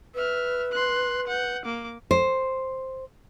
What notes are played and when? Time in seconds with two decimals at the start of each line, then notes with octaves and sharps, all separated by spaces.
0.15 B4 E5 F6
0.72 C6 F#6
1.27 F#5 G6
1.65 A#3 D6
2.11 C5